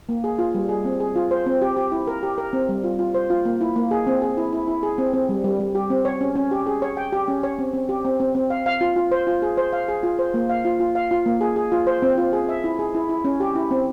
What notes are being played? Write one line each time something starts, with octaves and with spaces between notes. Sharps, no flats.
A#3
G#4
F4
G3
G#4
C4
G#4
F4
C5
C4
G4
G4
E4
A#4
G4
A#4
C4
G3
F4
F4
C5
F4
A#3
E4
A#3
G#4
C4
G#4
E4
E4
E4
G#4
C4
C4
G3
G3
G3
G4
C4
C#5
C#4
C#4
G4
G#4
C#5
G5
G4
C#4
C#5
C4
C4
G4
C4
C4
C4
F5
F5
F4
F4
C5
F4
G#4
C5
F5
G#4
F4
C5
A#3
F5
F4
F4
F5
F4
A#3
G#4
G#4
F4
C5
C4
F4
G#4
E5
E4
G#4
E4
E4
C#4
G4
E4
C4